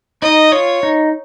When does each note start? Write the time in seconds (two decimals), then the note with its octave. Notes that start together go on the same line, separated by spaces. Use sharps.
0.22 D#4 D#5
0.52 F4 C#5
0.83 D#4